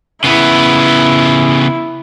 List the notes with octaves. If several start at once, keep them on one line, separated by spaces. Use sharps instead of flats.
C#3 B3 E4